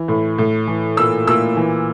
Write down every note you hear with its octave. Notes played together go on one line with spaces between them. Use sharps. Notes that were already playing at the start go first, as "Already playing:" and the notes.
Already playing: E3
A2
A2
E3
A#2 E6
A#2 E6
E3